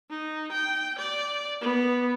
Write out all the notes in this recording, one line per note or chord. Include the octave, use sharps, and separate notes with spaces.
D#4
G5
D5
B3